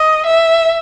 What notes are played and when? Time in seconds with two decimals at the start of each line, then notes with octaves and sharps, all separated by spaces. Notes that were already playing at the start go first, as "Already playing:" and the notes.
Already playing: D#5
0.26 E5